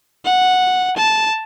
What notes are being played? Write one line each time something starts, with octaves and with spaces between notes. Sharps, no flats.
F#5
A5